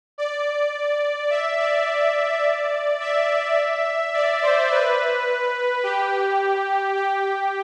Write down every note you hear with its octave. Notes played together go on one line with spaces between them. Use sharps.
D5
E5
D5
E5
D5
C5
B4
G4
G4